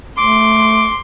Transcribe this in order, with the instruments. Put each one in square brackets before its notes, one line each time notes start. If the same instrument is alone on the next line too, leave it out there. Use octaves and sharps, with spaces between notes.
[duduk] A3 [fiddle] C6 [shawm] D6